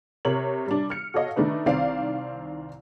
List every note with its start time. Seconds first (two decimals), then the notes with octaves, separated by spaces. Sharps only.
0.25 C3 A#4 C#5 F#7
0.67 G3 D4
0.90 F6 C#7
1.14 F#4 A4 C#5 D#5 F5
1.36 D#3 A3 D4 D#4 B4
1.66 C2 D#3 C4 D5 F5